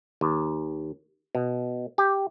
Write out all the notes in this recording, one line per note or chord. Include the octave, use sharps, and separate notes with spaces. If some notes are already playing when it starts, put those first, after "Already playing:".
D#2
B2
G4